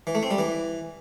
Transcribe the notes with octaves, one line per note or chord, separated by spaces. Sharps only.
E3
A3
C4
G3
E3